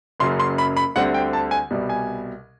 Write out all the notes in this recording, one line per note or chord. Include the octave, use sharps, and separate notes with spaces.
F#1 F#2 C#3 F#3 C6
C6
B5
B5
D2 D3 G3 C4 F#5
G5
A5
G#5
C2 B2 G3
G#5